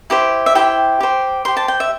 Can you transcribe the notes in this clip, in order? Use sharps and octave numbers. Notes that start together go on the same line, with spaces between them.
E4 G4 C5
E5
E4 G4 C5 G5
G4 C5
G4 C5 C6
A5
G5
E5